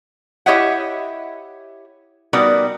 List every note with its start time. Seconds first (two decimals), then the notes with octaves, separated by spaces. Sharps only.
0.46 E4 G4 C#5 D#5 E5 F#5
2.33 G3 B3 D#4 F#4 A#4 D5